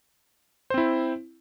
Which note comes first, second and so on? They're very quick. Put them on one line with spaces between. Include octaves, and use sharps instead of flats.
C5 C4 E4